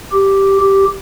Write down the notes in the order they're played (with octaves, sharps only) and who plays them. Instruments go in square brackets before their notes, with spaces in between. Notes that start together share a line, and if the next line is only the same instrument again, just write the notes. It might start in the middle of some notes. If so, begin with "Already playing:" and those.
[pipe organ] G4
G4